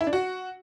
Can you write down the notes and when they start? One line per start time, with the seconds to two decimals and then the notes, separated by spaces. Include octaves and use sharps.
0.01 E4
0.07 D4
0.13 F#4